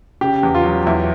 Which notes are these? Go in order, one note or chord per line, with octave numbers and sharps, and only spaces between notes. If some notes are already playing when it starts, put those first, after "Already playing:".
C#3 G4
E2
F4
F#3
E2 E4